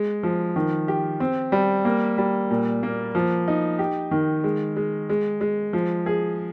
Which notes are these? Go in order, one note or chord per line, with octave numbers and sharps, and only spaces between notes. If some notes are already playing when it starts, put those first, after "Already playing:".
Already playing: G#3
F3
D#3
G4
C4
G3
A#3
G3
A#2
A#3
F3
D#4
G4
D#3
G#3
G#3
G#3
G#3
F3
G#4